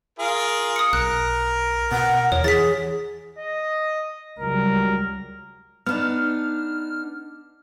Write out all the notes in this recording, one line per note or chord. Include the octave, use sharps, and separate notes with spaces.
F4 G#4 A#4
D#6 C#7
B1 A#4 F#6
B2 F#5
E2 C#5
E3 G#4 A6 B6
D#5
C#2 F#3 G3 A#4
B3 D4 D#4 F6